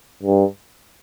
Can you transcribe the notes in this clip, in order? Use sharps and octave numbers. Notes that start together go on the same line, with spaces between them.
G2